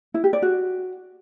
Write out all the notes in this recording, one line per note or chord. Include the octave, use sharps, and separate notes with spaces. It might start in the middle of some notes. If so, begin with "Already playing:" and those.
E4
G4
D5
F#4